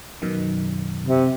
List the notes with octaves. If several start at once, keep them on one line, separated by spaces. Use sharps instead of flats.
F#2 B2 D#3
C3